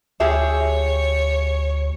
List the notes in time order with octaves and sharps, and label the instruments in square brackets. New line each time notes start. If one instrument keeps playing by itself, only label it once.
[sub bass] D2 [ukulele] G4 G#4 E5 [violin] C#5